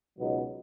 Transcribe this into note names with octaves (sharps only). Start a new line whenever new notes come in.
C#2 B2 F#3 B3 D#4